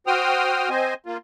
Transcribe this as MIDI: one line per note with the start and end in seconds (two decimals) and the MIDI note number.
0.07 0.69 66
0.07 0.69 72
0.07 0.69 79
0.07 0.69 87
0.07 0.69 89
0.70 0.94 60
0.70 0.94 72
0.70 0.94 75
0.70 0.94 80
1.06 1.17 58
1.06 1.17 65